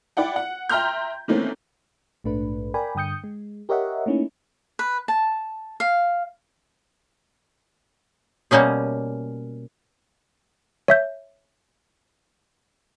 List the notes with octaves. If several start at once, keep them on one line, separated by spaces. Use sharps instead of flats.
E4 D5 F#5 G5
F#5
E5 G5 A#5 C6 F6 G6
D#3 E3 A3 A#3 C4 C#4
A#1 G#2 A3 D4 B4
A#4 D5 G5 G#5 B5
G2 D3 G5 D#6 G6 C#7
G#3
G4 A#4 C#5 D#5 E5 F#5
A3 A#3 C#4 D#4 E4
B4
A5
F5
B2 G3 A#3 C#4 G#4
C#5 E5 G6